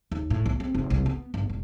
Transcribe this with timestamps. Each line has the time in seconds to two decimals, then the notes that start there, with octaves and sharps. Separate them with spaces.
0.12 D#2
0.30 A2
0.46 B1
0.60 C4
0.75 F1
0.90 C2
1.06 B3
1.34 G1
1.50 E1